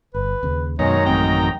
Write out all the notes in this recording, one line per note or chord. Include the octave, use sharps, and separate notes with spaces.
G1 B4
D#2 C#3
F#2 B2 D#3 G#3 C#5 A#5
A1 A3 C4 G5